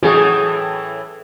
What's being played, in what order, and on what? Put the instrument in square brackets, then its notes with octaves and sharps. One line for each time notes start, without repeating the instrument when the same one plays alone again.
[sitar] A2 E3 [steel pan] F#4 G#4